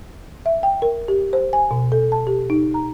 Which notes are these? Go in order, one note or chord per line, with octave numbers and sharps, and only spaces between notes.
E5
G5
A#4
G4
C5
G#5
B2
A4
A5
G4
D#4
A#5